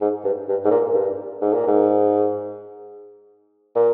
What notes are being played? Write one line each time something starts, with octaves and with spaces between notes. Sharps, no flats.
G#2
G2
G2
G#2
A#2
G2
G#2
A#2
G#2
A#2